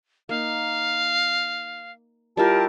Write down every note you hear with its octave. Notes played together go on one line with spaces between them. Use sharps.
A#3 D#4 F5
G3 E4 F4 G4 A#4 A5